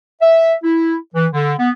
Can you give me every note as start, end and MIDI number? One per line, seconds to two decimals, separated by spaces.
0.21 0.53 76
0.63 0.96 64
1.14 1.27 52
1.32 1.53 50
1.58 1.69 59